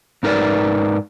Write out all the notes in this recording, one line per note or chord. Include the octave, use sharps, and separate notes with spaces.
G#2 D#4 A#4 B4 D5